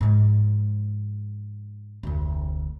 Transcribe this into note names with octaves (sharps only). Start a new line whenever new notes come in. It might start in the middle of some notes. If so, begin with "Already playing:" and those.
G#2 F3
F1 D2